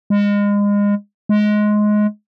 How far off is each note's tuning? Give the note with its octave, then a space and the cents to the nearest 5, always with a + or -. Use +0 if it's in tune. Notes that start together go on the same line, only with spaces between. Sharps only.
G#3 -30
G#3 +15